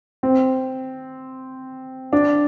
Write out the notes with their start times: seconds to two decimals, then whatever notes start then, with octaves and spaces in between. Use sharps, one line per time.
0.23 C4
2.13 D4